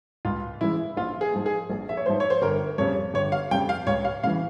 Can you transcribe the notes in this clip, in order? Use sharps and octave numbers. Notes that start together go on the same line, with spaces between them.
C#2 F4
C#3 E3 G#3 E4
A#1 F4
G#4
G#2 F3
G#4
A#1
E5
C#5
G#2 F3 C5
C#5
C5
G1 A#4
F2 C#3 G3 C#5
G1 C#5
F5
F2 C#3 G3 G5
F5
C#2 C#5
F5
C#3 E3 F5